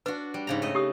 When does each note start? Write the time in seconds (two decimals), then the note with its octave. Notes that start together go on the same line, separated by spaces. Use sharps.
0.06 D4 F#4 B4
0.34 G3
0.47 G#2 C#3 A#5
0.62 A3 D#5
0.75 G4 D#6